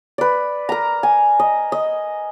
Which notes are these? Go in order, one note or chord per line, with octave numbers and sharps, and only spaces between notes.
B4 D5
A#4 A#5
G#5
D#5
D#5